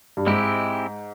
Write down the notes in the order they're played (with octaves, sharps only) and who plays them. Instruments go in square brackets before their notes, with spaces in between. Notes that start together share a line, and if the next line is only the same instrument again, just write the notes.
[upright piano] G2
[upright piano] G#2 [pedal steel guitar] G#3 C4 E4 G4